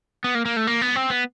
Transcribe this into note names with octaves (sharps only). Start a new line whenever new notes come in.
B3
A#3
A#3
A3
A#3
B3
C4
B3